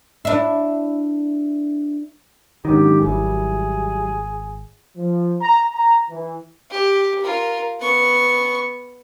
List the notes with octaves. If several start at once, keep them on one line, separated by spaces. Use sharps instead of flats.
D4 E4
G#2 D3 D#3 F#3 C#4 G4
G#1 F#3 G3 E4 G#4
F3
A#5
A#5
E3
G4
F4 A#4
B3 C#6